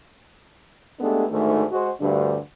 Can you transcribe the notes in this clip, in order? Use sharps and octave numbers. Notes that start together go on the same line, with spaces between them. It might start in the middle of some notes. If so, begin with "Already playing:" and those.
G#3 A3 B3 D4 G4 A4
D2 G#2 D#3 A3
G#3 F#4 C5
D2 G2 D3